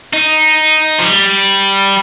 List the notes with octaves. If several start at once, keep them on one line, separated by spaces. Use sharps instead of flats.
D#4
F3
G3